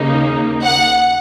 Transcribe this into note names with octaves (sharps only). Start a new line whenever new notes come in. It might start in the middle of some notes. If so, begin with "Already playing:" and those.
Already playing: D#2 C#3 A#3 D#4
F#5